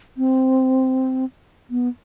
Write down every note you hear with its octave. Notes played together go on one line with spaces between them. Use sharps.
C4
B3